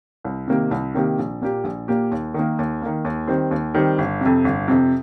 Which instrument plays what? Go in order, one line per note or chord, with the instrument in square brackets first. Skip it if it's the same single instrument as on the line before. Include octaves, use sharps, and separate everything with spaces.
[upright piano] C2
C3 D#3 A#3 G4
C2
C3 D#3 A#3 G4
A#1
A#2 A#3 G4
A#1
A#2 A#3 G4
D#2
D#3 A#3
D#2
D#3 A#3
D#2
D#3 G3 C4
D#2
D#3 G3 C4
G1
F2 C3
G1
F2 C3